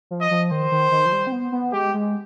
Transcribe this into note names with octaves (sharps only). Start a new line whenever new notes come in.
F3
D#5
F3
D#3 C5
D#3
D#3
F3
G3
C4
B3
B3
G#3 G4
G#3